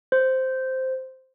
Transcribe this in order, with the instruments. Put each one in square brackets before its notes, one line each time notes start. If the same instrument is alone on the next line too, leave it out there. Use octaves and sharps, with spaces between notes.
[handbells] C5